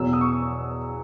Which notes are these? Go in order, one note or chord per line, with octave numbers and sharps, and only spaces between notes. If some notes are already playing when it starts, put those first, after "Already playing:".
Already playing: E2 B2 F#3 E6
D#6
C#6